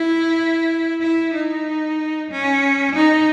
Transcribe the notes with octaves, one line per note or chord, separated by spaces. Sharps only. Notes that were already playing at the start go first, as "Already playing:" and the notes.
Already playing: E4
E4
D#4
C#4
D#4